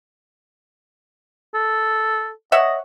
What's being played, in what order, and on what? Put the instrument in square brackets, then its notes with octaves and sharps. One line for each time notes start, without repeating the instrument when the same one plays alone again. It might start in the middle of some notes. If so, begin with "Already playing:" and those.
[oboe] A4
[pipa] C#5 E5 F#5 [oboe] D#5